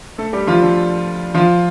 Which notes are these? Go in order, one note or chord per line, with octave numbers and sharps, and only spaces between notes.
A3 A4
G3 G4
F3 F4
D3 D4
F3 F4